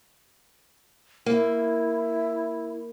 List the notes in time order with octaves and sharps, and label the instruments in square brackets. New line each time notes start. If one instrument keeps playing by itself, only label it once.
[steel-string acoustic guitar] A#3 [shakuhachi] E4